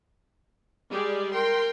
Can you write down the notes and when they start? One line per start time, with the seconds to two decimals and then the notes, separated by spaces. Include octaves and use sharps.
0.90 G3 G#3 G4 G#4 D5
1.32 A#4 G5 C6